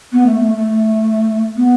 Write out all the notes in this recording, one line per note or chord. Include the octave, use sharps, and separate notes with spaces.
B3
A3
A3
A3
B3